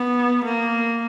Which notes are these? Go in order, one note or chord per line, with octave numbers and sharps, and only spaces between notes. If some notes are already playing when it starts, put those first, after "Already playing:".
Already playing: B3
A#3